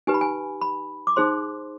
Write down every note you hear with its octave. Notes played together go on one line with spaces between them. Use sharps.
D#4 G4 B4 G#5
B5
G#5
B5
D6
D#4 G#4 C5 C6